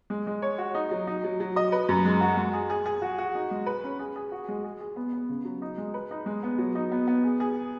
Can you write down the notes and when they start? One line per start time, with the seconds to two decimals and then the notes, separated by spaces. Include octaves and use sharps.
0.10 G#3
0.27 G#3
0.42 C#5
0.58 F#4
0.75 D#4
0.91 F#3
1.07 D#4
1.24 F#3
1.40 F#3
1.56 D#5
1.72 B4
1.89 F#2
2.05 G#3
2.21 F#4
2.37 G#3
2.53 G#4
2.70 G#4
2.86 G#4
3.02 F#4
3.18 F#4
3.35 D#4
3.51 G#3
3.66 B4
3.84 C#4
3.99 G#4
4.16 G#4
4.32 F#4
4.48 G#3
4.64 G#4
4.80 G#4
4.96 B3
5.13 B3
5.29 C#3
5.45 F#3
5.62 D#4
5.78 G#3
5.94 B4
6.11 D#4
6.26 G#3
6.43 B3
6.58 F#3
6.75 D#4
6.92 B3
7.07 B3
7.24 G#4
7.40 G#4